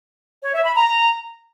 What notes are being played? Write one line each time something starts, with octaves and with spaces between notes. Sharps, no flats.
C#5
E5
B5
A#5